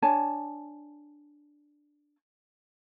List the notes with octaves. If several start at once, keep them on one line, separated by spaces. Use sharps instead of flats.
D4 C#5 G#5 A5